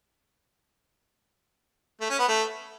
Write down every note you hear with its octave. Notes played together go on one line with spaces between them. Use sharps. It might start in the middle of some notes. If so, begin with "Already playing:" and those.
A3
C#4
B3
A3